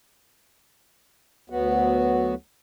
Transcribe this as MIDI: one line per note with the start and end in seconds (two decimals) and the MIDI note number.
1.50 2.35 38
1.50 2.35 54
1.50 2.35 59
1.50 2.35 66